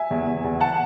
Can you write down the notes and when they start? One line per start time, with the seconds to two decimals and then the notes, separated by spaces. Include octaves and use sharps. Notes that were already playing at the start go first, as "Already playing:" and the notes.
Already playing: E5 G#5
0.11 E2
0.27 E2
0.44 E2
0.60 F#5 A5